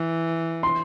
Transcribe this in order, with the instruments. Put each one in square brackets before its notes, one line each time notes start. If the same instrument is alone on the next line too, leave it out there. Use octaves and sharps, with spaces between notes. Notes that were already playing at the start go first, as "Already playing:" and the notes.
Already playing: [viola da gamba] E3
[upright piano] C6